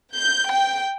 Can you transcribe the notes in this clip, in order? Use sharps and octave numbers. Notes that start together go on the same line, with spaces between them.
G6
G5